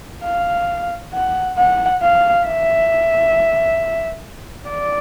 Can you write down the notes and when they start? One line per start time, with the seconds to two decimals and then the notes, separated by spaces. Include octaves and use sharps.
0.24 F5
1.14 F#5
1.58 F#5
2.02 F5
2.47 E5
4.69 D5